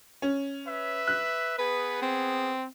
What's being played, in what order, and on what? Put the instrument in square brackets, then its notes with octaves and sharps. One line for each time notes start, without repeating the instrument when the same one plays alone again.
[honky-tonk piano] C#4
[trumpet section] B4 E5
[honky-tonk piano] F#6
[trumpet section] B3 G#4 [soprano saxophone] B4
[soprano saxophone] C4